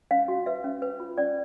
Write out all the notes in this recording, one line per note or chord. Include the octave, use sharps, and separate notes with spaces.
C#4 F5
F#4
B4 E5
C#4
B4
F4
C#4 D5